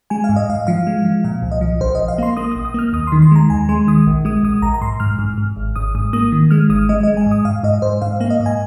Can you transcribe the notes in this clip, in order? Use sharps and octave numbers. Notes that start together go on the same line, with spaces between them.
G#3 G#5
F5
G#2
D#5
G#2 F5
F3 F5
G#3
F3
A#2 F5
C2
D#5
F3
A#1 C5
A#1 D#5
F5
A#3 C6
A#3 D#6
A#1 D#6
D#6
A#3 F6
F6
D#2 D#6
D#3 C6
C6
G#3 A#5
D#2 G#5
G#3 C6
D#3 D#6
A#1
G#3 D#6
A#1 D#6
A#1 A#5
A#5
G#2 C6
G#2 F6
G#2
G#2
G#1
G#1 D#6
G#2 D#6
A#3 D#6
D#3
G#3 F6
G#1 D#6
G#3 D#5
G#3 D#5
G#5
G#2
D#6
G#2 F5
G#2 D#5
G#2 C5
G#2 F5
A#3 F5
D#5
G#2
G#5